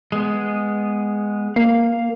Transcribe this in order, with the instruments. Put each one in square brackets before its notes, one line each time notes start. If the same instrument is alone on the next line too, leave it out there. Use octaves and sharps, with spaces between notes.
[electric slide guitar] G#3 B3
[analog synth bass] A#3 [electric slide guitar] F5